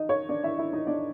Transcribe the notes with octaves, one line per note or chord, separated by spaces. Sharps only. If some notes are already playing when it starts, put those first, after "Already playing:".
Already playing: D#4 D#5
C#5
D4 D5
E4 E5
E4 E5
D#4 D#5
D4 D5